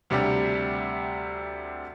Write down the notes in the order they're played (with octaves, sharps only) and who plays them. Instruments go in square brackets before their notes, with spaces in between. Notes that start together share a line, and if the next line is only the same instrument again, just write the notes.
[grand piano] D2 C3 G3 D4 G4